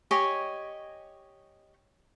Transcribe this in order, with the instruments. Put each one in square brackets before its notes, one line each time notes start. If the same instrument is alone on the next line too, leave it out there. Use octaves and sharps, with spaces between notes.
[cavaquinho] G4 C#5 D#5 G#5